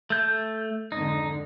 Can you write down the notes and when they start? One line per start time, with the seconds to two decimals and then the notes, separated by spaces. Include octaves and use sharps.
0.10 A3 G6
0.92 F2 G#2 D3 D#4